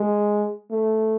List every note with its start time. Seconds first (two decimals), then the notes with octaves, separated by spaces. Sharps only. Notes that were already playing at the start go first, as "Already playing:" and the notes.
Already playing: G#3
0.71 A3